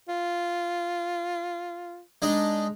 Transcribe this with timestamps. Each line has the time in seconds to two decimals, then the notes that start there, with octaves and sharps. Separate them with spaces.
0.08 F4
2.22 G#3 D4 D#4